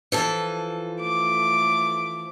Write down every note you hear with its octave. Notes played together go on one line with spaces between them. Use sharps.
E3 F3 A4
A3 D6